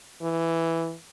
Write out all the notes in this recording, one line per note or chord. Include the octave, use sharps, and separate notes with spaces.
E3